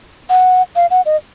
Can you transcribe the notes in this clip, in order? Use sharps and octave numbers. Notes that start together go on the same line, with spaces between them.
F#5
F5
F#5
D#5